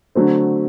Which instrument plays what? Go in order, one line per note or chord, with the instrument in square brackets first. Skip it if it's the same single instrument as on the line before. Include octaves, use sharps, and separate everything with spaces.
[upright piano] D3 F#3 A3 C4